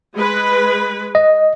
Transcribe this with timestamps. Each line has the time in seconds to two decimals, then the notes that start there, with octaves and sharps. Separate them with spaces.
0.14 G#3 B4
1.15 D#5